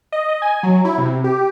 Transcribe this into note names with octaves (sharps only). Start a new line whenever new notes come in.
D#5
D#5
G#5
F#3
E4
C3
G4